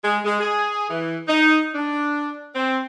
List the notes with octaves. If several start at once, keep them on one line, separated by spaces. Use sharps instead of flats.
G#3
G#3
G#4
E3
D#4
D4
C4